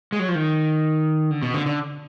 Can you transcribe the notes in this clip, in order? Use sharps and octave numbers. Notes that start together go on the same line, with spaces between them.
G#3
F#3
F3
D#3
D3
B2
D3
D3